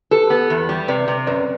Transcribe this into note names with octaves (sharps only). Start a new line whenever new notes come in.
G4 A4 B4
B3
E2
G3
C3 B4 D5
C3
F#2 B4 D5